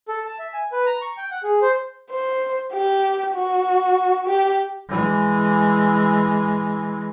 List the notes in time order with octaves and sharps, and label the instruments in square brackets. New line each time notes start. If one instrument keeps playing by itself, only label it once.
[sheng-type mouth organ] A4
A5
E5
G#5
B4
A#5
C#6
G5
F#5
G#4
C5
[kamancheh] C5
G4
F#4
G4
[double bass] E3 G#3